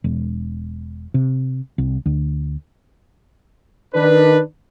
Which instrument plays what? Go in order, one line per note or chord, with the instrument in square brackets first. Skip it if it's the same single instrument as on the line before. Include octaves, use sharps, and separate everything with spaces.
[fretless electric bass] E1
C3
C2
D2
[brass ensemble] D#3 D4 B4